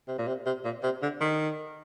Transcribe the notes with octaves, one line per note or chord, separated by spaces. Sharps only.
C3
A#2
C3
C3
A#2
C3
D3
D#3